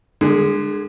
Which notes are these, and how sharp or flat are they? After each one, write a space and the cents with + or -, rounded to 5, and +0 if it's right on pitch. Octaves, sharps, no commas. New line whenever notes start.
D3 +30 G#3 -10 G#4 +5